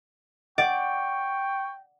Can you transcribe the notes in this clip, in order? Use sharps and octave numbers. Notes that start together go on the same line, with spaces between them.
D5 F#5 G5 C#6